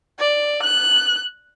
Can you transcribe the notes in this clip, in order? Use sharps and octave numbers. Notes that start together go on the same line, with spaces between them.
D5
F#6